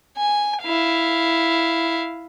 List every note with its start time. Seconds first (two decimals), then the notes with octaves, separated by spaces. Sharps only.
0.17 G#5
0.63 E4 F5